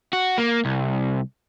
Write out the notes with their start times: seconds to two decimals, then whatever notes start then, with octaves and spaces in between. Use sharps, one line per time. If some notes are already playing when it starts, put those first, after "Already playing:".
0.13 F#4
0.38 A#3
0.65 C2